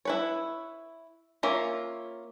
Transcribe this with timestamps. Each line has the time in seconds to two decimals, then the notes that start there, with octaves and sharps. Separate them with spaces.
0.05 E4 B4 C#5
1.43 A#3 C#4 F4 E5